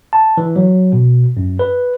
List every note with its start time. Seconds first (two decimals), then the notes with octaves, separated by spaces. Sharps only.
0.13 A5
0.37 E3
0.56 F#3
0.93 B2
1.37 F#2
1.59 B4